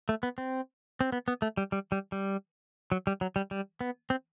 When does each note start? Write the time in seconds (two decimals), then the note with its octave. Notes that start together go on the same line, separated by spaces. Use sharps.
0.09 A3
0.23 B3
0.38 C4
1.01 C4
1.12 B3
1.28 B3
1.42 A3
1.57 G3
1.72 G3
1.92 G3
2.12 G3
2.92 F#3
3.07 G3
3.21 F#3
3.36 G3
3.51 G3
3.81 B3
4.10 C4